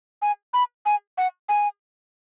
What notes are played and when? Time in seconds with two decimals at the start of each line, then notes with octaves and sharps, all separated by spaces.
0.22 G#5
0.54 B5
0.86 G#5
1.18 F#5
1.49 G#5